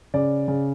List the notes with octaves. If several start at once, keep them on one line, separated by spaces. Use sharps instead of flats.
C#3 D5
C#3